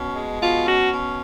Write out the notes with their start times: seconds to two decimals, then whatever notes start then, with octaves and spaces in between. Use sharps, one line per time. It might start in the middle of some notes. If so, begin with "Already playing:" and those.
Already playing: B2 C#4
0.15 G#3
0.40 B2 F4
0.65 C#4 F#4
0.91 B2